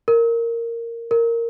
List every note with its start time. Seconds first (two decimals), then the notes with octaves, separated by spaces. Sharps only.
0.08 A#4
1.11 A#4